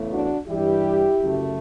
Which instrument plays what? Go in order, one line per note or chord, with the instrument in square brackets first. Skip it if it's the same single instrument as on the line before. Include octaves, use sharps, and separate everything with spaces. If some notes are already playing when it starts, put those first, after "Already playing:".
Already playing: [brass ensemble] E2 C#3 E3 A3
D4 F#4
G2 E3 G3 E4 G4
F#2 C#3 F#3 A3